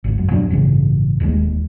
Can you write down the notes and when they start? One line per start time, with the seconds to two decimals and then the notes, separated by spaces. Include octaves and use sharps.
0.04 G#1 D2
0.18 F#2
0.30 E2 B2 F#3 D4
0.50 A1 G2 C#3 E3
1.20 E1 D#2 D3 G#3